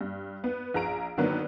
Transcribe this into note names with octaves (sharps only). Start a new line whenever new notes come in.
G2
B3
A#1 G#4 A#5 D7
D3 D#3 F#3 A#3 B3 D4